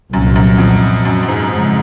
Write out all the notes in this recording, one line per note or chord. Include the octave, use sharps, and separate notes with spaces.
C2 F#2 A#2 F#3
F#2
F2
F#2
F#2
G#2
F2 C#3 G#3